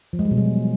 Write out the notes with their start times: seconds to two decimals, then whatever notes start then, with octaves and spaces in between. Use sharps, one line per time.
0.13 F3
0.19 G#3
0.25 G3
0.31 B2
0.37 F#3